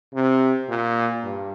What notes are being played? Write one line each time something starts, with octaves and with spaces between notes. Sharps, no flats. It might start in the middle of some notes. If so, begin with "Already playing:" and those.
C3
A#2
G2